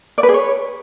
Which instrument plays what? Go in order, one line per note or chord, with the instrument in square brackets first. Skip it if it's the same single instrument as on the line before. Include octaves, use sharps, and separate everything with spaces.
[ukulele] D5
B4
G#4
C#5